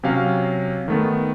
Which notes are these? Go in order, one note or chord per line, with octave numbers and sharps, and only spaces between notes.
C3 F#3 C#4 F5
D#3 A3 B3